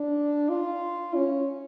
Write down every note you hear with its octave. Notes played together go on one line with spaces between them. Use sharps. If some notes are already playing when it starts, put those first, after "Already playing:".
Already playing: D4
F4
C#4